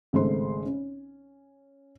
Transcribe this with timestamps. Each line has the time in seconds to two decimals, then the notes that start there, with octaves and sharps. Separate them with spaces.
0.13 G#1 C#3 G#3 A3 C5 C6
0.66 C#4